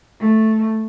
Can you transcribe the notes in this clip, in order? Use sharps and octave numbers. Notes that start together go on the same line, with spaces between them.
A3